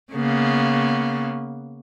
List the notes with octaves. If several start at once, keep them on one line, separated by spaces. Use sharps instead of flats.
C#3 A#3 B3